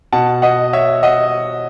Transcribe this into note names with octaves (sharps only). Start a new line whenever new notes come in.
B2 F#5 A5
D#5 F#5
C#5 E5
D#5 F#5